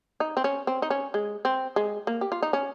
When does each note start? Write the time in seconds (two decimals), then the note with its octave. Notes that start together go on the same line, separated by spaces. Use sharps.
0.20 D#4
0.37 C4
0.44 C#4
0.67 C4
0.82 D#4
0.90 C#4
1.14 G#3
1.45 C4
1.76 G#3
2.07 A#3
2.21 G4
2.32 F4
2.43 D#4
2.53 C#4